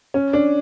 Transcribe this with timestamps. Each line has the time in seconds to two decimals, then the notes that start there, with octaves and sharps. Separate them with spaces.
0.14 C#4
0.33 D4